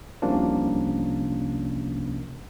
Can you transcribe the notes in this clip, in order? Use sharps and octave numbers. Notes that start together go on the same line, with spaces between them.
C2 C3 F3 A#3 C#4 D4